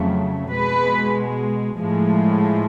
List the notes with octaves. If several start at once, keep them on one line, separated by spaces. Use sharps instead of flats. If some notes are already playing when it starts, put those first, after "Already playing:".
Already playing: F2 C#3 F#3 A3
B2 G#3 B4
A2 F3 G#3